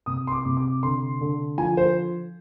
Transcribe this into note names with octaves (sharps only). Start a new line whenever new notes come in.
C3 D#6
C6
D6
C3
D6
D3 C6
D3
F3 G#5
C5